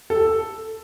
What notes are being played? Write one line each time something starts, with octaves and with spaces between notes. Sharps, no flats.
A4